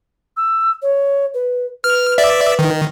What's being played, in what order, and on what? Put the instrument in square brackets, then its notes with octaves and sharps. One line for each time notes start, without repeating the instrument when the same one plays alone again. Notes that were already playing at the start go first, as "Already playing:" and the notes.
[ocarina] E6
C#5
B4
[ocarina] B4 [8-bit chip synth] F6
[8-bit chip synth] D5 E5
D#3